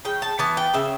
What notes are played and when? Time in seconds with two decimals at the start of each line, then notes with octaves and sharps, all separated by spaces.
0.05 C#3 G5
0.22 A5
0.39 E3 B3 A5
0.57 G5
0.74 C#3 E5